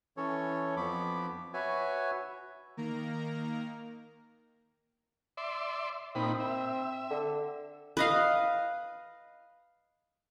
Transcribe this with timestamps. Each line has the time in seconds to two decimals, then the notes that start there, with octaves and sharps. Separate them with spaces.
0.17 E3 C#4 A4 C#5
0.77 F2 F3 B3 B5 D6
1.54 F#4 B4 C#5 E5 G#5
2.77 D#3 A#3 A#4 A#5
5.37 D5 E5 C6
6.15 A#2 C4 D#4 B5
6.40 E5
7.10 D3
7.97 B4 D#5 F5